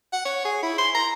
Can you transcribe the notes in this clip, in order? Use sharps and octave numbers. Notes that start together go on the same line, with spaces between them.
F#5
C#5
G#4
E4
C6
A#5